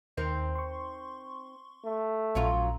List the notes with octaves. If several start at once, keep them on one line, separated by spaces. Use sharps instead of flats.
D#2 C4 D#4 A#4
C6 C#6
A3
A#1 F#3 C#4 F4 A#5